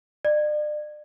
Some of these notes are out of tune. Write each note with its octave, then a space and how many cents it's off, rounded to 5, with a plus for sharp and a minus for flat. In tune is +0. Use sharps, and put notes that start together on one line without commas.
D5 +40